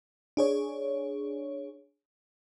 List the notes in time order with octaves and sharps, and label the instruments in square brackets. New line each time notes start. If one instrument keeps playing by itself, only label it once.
[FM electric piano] D4 G#4 C#5